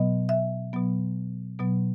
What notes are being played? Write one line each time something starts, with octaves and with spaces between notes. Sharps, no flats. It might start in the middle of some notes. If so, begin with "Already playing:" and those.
Already playing: B2 F#3 B3 D#5
E5
B2 F#3 B3
B2 F#3 B3